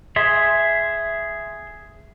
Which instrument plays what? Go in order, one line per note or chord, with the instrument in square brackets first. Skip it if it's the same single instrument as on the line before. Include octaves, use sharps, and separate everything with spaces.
[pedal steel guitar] G#4 E5 C6